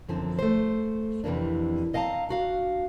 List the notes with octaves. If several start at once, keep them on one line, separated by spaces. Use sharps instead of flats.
F#2 D3 F3 C4
A3 C5
F2 C3 E3 A#3 D4
C4 D#5 F5 G5 A5 A#5
D4 F#4 F5